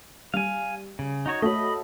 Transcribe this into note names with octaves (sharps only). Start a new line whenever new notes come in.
G3 F5 G#5
C#3
D#4 F#4 C#5
A3 F#4 C#5 D#5 B5